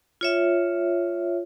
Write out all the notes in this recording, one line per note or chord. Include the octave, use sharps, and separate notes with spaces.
F4 C#5 E5